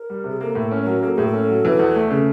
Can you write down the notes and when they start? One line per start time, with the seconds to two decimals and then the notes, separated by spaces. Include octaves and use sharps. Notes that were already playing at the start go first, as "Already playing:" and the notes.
Already playing: A#4
0.10 G3
0.24 C3 G#4
0.40 A#3 A4
0.55 A2
0.60 A4
0.71 C#4
0.81 F#3 A#4
1.02 A#3 A4
1.14 A2 G#4
1.27 A4
1.34 C#4
1.49 F#3
1.65 E3
1.79 E2
1.95 A3
2.10 C#3